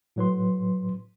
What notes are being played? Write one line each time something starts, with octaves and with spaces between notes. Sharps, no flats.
A2 F#3 B4 C6